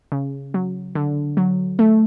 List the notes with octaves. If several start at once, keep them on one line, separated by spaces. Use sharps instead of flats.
C#3
F#3
D3
F#3
A3